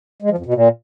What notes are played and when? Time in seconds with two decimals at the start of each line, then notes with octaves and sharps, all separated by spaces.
0.22 G#3
0.30 F3
0.38 F2
0.46 B2
0.54 A#2